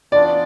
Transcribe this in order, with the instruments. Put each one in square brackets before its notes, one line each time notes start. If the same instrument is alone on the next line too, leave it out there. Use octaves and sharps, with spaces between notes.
[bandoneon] E3 B3 D4 F4 [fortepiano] D5